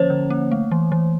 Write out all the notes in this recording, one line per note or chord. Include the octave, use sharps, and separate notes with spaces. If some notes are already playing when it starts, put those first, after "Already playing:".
Already playing: D3 F3 A#3 C#4 C5 C#5
D3
A#3
A3
E3
E3